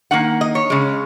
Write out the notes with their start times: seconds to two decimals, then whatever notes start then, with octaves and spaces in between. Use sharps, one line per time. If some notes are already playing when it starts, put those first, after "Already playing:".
0.11 D#3 A#3 F#5
0.41 D#5
0.55 C#5
0.70 C#3 G#3